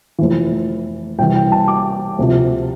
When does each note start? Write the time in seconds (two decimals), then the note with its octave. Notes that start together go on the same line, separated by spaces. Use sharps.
0.19 F1 F2 E3
1.19 C2 C3 E3 G5
1.36 G5
1.52 A5
1.68 D6
2.19 D2 C3 F3